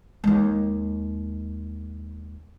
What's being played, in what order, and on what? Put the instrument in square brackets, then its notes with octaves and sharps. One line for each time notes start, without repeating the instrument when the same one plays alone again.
[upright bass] D#2 G#3